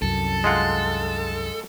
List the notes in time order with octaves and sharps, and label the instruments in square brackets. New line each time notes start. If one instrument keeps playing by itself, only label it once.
[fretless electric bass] C2 F#2 [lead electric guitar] A4
[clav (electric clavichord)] G#3 F4 F#5